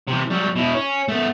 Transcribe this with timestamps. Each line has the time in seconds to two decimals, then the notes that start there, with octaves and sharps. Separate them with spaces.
0.08 C3 E3
0.30 F#3 G3
0.56 B2 E4
0.74 C#4
1.08 A3 B3